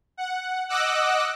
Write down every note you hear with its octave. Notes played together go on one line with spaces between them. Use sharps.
F#5
D#5 F#5 D6 E6 F#6